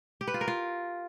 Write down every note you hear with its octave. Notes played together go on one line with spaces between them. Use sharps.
G4
B4
F4
A#4
F4